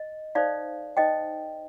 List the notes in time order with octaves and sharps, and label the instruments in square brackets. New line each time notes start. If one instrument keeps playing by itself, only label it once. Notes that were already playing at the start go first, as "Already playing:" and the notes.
Already playing: [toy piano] D#5
D#4 A4 C5 D5 F5
D#4 A4 C5 D#5 G5